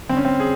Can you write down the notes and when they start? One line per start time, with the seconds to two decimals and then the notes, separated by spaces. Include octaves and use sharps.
0.09 G1 C4
0.17 C#4
0.25 C4
0.40 G#4